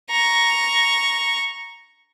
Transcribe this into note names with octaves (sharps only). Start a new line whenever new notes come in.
A#5 C#6